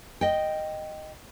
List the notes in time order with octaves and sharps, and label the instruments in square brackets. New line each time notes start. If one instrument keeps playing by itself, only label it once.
[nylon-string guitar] D#5 G5